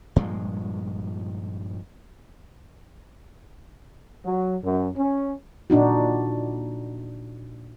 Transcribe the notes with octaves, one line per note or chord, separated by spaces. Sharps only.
G2 A#2 F3 G#3
F#3
F#2
C#4
A#2 D4 D#4 F#4